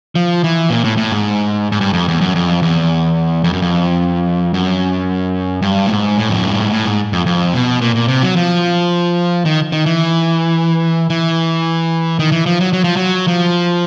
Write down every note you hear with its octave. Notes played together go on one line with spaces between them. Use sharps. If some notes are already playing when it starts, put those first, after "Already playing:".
F3
E3
A#2
A2
A2
G#2
G#2
G2
F2
E2
F#2
F2
E2
F2
F#2
F2
F#2
G2
A2
G#2
A2
F2
F#2
G2
G#2
A2
G#2
F2
F2
B2
A#2
A#2
C3
F#3
F3
D#3
D#3
E3
E3
D#3
E3
F3
F#3
F#3
F3
F#3
F3